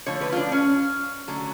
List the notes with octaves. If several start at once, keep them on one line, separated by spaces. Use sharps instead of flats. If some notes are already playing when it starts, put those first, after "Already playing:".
D3 F3 A3 C#5
B4
F4
D4
C#4
D3 F#3 A3